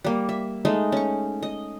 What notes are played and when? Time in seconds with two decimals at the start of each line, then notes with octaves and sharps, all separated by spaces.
0.04 G3 A#3
0.29 E5
0.65 G#3 A3 D#4
0.92 C#4 C#6
1.43 D#5